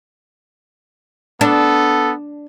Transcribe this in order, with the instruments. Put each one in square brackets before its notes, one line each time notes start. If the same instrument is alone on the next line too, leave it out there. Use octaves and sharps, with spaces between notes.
[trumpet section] B3 A4 [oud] D4